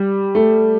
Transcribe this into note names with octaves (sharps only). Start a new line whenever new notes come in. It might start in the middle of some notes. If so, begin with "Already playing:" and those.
Already playing: G3
A3